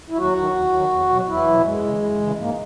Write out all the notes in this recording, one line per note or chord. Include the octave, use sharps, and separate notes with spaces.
E4
D#2 F#3 F#4
D#3 F#3
D#2
D#3 F#3
E2
B2 F#3
E2 E3 E4
B2 F#3
F#2 G#3
C#3 E3
F#2
C#3 E3
G#2 A#3